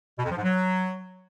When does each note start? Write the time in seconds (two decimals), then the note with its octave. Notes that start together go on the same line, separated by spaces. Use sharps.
0.18 B2
0.24 F2
0.31 F3
0.37 G#2
0.43 F#3